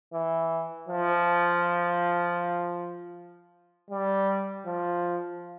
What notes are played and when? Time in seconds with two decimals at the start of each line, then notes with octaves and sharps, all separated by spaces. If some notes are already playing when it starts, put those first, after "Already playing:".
0.13 E3
0.89 F3
3.91 G3
4.66 F3